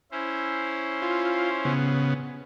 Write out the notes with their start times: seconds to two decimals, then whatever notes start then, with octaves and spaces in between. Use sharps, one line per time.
0.11 C#4 E4 C5
1.02 F4
1.65 C#3 B3